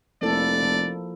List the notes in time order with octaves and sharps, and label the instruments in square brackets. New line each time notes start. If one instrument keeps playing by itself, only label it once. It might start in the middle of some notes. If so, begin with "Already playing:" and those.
[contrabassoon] F1 [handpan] A#3 E4 A4 [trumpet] D5
[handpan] F3